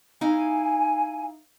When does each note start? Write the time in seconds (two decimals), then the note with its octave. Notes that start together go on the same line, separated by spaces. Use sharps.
0.21 D#4 E4 F5 G#5